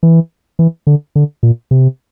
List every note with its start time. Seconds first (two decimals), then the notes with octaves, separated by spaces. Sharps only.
0.03 E3
0.59 E3
0.87 D3
1.16 D3
1.43 A#2
1.71 C3